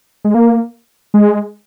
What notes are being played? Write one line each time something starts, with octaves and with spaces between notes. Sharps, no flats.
G#3
A#3
G#3